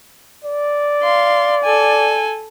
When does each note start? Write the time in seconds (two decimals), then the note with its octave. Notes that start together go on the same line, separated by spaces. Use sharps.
0.45 D5
1.03 F5 C6
1.64 A4 G#5